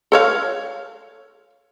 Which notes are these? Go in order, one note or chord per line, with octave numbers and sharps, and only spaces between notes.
A4 C#5 F5